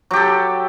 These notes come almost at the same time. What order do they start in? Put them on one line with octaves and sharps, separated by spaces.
F#3 G4 A4